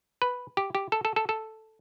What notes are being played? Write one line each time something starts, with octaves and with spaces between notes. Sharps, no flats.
B4
G4
G4
A4
A4
A4
A4